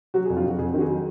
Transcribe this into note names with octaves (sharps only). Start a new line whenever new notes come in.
F#3 F#4
G#4
F2
F4
F2 F#4
F2 G#4
D#3 F#4
G#4
F#3